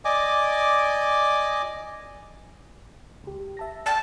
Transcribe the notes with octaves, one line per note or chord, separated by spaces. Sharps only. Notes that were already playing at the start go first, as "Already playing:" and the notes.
D5 D#5 G#5 D6
C#2 G4
E5 A5 A#6
D5 G5 A5 F6